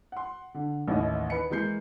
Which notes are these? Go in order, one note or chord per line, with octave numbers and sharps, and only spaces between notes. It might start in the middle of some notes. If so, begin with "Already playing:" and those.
F#5 C6
D3
A1 D#2 D#3 E4 D#5
B4 C#7
E3 G#3 A#3 G6 C7